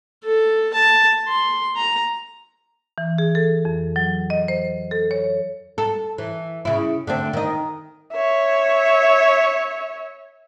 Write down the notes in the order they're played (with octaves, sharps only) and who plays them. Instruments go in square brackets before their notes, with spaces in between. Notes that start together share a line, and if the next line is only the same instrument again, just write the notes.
[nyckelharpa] A4
A5
C6
A#5
[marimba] E3
G#4
A4
F2
F#3
D#5
C5
A4
C#5
[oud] A4
E3
C#3 E4
D3 A3 C4
D#3 D#5
[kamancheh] C#5 E5